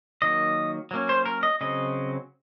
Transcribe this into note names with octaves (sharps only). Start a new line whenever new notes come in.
D#3 F#3 A#3 D#5
F#3 A#3 C#4
C5
A#4
D#5
C#3 F#3 C4 D#5